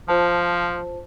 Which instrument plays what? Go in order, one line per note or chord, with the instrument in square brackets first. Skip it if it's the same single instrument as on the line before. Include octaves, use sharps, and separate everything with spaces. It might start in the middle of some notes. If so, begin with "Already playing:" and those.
[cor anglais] F3 [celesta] F4 C5 A5